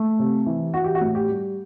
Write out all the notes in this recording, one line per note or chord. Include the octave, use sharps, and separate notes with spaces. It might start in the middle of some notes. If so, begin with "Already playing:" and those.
Already playing: A3
C3
E3
E3 F#4
G4
F#4
A2
G4
G3